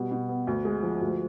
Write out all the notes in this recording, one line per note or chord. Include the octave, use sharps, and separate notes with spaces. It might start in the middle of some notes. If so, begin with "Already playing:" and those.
Already playing: B2 G3
B2
B3
D2
G#3
F3
D2